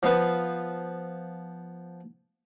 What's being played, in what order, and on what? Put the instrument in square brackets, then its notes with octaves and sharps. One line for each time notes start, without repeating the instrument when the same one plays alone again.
[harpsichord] F3 B3 B4